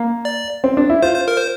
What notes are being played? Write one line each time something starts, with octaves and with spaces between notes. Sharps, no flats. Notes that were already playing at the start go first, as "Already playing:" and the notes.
Already playing: A#3
D5
C4
D4
E4
F4 C5
C5
A#4
C5